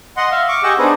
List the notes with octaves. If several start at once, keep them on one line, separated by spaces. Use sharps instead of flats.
D#5 F#5 C6
E5 F5
C#6 D6
G4 G#4 D#5 F#5 C#6 E6
B3 D4 D#4 G#4 B4 C5